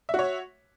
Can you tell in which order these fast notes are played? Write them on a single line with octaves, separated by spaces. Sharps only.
E5 F#4 C#5